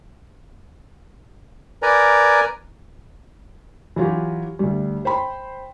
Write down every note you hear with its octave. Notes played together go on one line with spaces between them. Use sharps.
A#4 B4 D5 G#5 A#5
E3 F#3 F4 G4
D2 G3
C5 G5 B5 C6